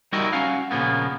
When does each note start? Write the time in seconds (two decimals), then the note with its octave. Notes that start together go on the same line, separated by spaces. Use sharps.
0.13 G3 D#4 E4 F#4 A#4 D#5
0.33 C#4 F#4 F5
0.71 A#2 C#3 F3 A#3 B3